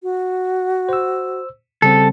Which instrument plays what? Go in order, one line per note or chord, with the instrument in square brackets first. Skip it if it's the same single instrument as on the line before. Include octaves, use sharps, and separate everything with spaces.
[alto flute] F#4
[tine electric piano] C5 E6
[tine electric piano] C#3 G3 C4 [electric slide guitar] A4